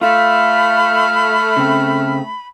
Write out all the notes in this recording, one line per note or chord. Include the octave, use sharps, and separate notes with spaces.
A3 F4 B5 F6
C#3 C4